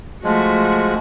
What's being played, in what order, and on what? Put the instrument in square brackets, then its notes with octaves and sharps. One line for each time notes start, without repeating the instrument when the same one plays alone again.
[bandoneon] F3 G#3 [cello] A3 F#4